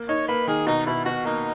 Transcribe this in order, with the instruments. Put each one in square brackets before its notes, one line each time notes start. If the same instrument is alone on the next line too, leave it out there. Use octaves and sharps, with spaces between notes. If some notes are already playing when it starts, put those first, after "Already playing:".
Already playing: [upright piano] A#3
[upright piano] D#4 [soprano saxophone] C#5
[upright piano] A#3 [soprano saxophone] B4
[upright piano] D#3 [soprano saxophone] G#4
[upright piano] B2 [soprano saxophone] D#4
[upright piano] B2 [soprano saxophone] E4
[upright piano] B2 [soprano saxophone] F#4
[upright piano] A#3 [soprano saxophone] D#4